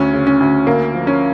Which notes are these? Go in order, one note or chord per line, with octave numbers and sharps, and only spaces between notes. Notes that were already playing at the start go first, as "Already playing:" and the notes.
Already playing: D2 C#4
C#3
C#4
D2
D2 A#3
F3
C#4